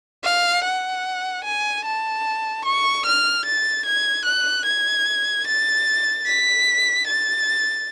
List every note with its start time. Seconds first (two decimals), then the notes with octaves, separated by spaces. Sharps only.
0.24 F5
0.64 F#5
1.44 G#5
1.85 A5
2.65 C#6
3.06 F6
3.45 A6
3.85 G#6
4.25 F#6
4.65 G#6
5.47 A6
6.26 B6
7.07 A6